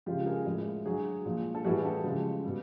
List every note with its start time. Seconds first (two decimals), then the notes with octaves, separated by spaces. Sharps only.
0.06 C#3 F3 G#3 F4 G4
0.26 G#4 A#4
0.46 A2 F3 G#3
0.86 D3 F#3 F#4 G#4
1.25 A#2 F3 G#3
1.55 A4
1.64 A2 E3 G3 F#4 G#4
1.84 G4 A4
2.04 C#3 F3 G#3
2.44 B2 G3